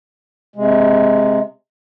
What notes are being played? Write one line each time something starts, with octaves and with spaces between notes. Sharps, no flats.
C3 G#3